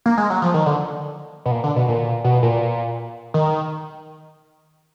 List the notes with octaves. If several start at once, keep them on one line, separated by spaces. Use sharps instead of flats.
A#3
G#3
F#3
F3
D#3
D3
B2
A#2
D3
B2
A#2
B2
A#2
D#3